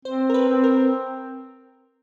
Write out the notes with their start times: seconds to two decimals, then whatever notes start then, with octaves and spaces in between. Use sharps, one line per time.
0.05 C4 C5
0.30 A#4
0.34 B4
0.49 C4
0.64 A#4